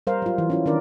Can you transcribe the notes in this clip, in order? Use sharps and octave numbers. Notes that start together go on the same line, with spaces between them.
G3 A#4 C5 F5
F#3 F4
E3
C#4 E4 F4
D#3 C#4 D4 A#4 D5